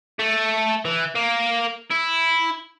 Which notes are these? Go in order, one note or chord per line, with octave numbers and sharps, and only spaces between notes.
A3
E3
A#3
E4